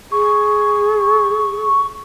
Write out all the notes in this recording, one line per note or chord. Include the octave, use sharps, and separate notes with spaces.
G#4 C#6